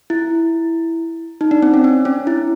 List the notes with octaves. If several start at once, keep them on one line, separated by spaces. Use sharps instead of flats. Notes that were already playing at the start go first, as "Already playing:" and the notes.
E4
D#4
D4
C4
C#4
D4
C#4
E4